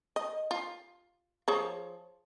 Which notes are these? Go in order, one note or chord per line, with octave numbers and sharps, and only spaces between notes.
D#5
F4
F3 G#4 C#5